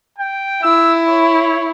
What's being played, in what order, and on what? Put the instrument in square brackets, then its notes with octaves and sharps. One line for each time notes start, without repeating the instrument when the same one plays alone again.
[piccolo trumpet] G5
[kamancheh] E4 [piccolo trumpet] E6
[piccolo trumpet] C#5